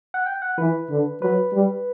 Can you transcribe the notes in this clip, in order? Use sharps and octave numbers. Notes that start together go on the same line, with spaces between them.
F#5
G5
F#5
E3 B4
D3
F#3 B4
G3